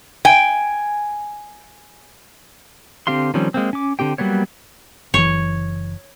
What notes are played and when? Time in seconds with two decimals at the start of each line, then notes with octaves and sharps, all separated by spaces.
0.25 G5 G#5
3.07 D3 C4 G4 F5 C6
3.34 D#3 F3 G3 C4 C#4
3.54 G#3 A#3 C4
3.73 C#4 D6
3.99 D3 C4 G4 G5
4.18 F#3 G3 A#3 B3 C#5
5.14 F#1 E3 C#5